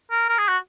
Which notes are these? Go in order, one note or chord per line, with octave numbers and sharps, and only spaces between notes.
A#4
A#4
G#4
F#4